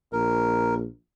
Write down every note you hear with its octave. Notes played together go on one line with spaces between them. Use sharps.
A#1 A#4